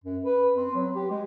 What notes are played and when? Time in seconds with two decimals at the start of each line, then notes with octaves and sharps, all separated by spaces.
0.04 F#2
0.24 B4
0.57 C4
0.75 F#3
0.95 G4
1.11 G#3